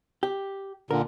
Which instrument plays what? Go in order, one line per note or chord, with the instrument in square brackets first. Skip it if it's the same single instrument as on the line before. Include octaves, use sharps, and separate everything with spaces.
[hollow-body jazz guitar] G4
[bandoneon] A#2 D3 [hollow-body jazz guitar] A#4